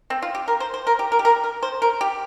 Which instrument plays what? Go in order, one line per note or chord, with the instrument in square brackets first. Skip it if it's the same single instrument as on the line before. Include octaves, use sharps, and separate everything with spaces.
[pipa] C4
F4
G4
A#4
C5
C5
A#4
G4
A#4
G4
A#4
A#4
C5
A#4
G4